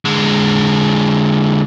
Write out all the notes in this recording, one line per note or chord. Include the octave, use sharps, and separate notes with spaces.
D3 G#3